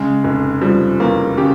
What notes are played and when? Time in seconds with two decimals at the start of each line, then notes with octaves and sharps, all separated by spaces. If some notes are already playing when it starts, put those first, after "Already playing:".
Already playing: C#3 G#3
0.24 F1
0.61 F3 G3
1.00 E2 A#3
1.37 C#3 G4